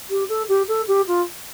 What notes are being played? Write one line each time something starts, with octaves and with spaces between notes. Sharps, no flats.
G4
A4
G4
A4
G4
F4